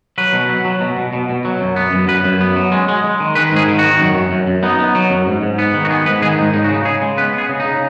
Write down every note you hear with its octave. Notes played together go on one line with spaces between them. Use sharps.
F#3 B4
B2
F#3
F#3
B2
B2
B2
B2
F#3
F#2
B3
F#2
F#2 B4
F#2
B3
F#3
G#3
G#3
G#3
D#3
D#3 B4
G#2 G#4
D#3
D#3 F#4
F#2
F#2
F#2
F#2
B3 D#4
B3
F#3
F#2
G#2
G#2
B3
D#3
F#4
B3 G#4
G#2 B4
D#3 G#4
G#2 D#4
C#3 D#4
F#4
C#3 D#4
C#3 G#4
G#3
B3 B4
B3 G#4
C#3
D#4
C#3